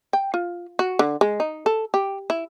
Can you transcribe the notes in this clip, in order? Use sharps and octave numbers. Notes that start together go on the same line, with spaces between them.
G5
F4
F#4
D3
G#3
D#4
A4
G4
E4